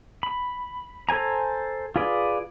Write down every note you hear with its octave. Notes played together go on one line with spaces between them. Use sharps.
B5
A4 C5 G#5 A#5
F4 G#4 B4 D5